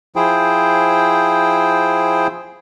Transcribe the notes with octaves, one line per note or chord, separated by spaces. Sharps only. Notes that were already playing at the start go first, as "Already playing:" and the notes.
F3 E4 G#4 C5 G5